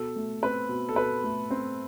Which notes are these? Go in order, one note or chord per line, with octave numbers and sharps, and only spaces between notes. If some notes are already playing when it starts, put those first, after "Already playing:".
Already playing: B2 A4
A3
C4 B4
B2
A4
B2 B4
A3
C4